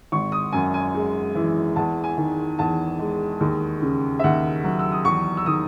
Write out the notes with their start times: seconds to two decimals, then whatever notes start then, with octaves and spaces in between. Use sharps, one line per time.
0.12 G#1 C#6
0.32 D#6
0.53 F#2 G#5
0.74 G#5
0.94 G#3
1.35 E3
1.76 E2 A5
2.04 G#5
2.17 D#3
2.59 E2 A5
2.99 G#3
3.40 D#2
3.82 C#3
4.19 E5
4.24 D#2 F#5
4.64 F#3
4.79 E6
4.92 D#6
5.05 E2 C#6
5.37 E6
5.46 D#3 D#6